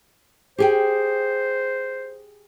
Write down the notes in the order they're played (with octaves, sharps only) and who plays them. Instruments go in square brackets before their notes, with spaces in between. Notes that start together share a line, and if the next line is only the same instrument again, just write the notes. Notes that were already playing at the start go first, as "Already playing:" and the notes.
[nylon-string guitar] G4 G#4 G5 [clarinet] C5